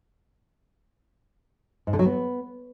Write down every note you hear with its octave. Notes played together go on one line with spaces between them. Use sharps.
G#2
D3
F#3
B3